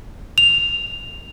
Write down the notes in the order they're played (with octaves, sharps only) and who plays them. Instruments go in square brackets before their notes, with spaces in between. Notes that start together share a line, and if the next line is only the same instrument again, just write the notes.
[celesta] F7